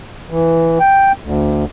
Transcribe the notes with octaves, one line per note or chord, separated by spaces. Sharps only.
E3
G5
D2